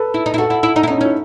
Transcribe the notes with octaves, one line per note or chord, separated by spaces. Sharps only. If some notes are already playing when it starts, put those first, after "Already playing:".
Already playing: A4 B4
E4
D#4
E4
F#4 A4
E4
E4
D#4
E4
C#4 D#4
D#4
C#4
E4